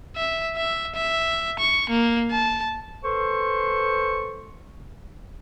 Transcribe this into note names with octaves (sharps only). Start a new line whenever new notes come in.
E5
E5
E5
C#6
A#3
A5
A4 B4 C5 C6 C#6